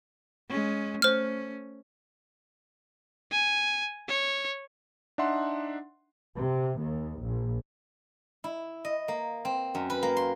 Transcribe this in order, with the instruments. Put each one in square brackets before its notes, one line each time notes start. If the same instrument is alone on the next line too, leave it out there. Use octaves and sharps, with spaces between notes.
[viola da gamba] G#3 C#4
[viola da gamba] A3 C#4 [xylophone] C5 F6
[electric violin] G#5
C#5
[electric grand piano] D4 D#4 E5 F#5 C6
[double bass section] C3
D#2
A#1
[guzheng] E4
D#5
A#3
C4
F#2
B4
A#3
C6